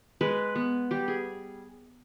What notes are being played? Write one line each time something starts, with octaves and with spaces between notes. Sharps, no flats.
G#3 B4
B3
G3 G4
G#4